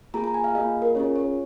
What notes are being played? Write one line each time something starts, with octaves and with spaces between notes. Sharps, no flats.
A#3 F4 G#4 A#5
A#5
G#5
F5
A#3 F4 G#4 D#5
A#4
C#4 F4 G#4 C#5
C#5